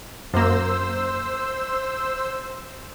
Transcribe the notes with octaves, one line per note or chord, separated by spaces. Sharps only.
F#2 A#3 C5 E6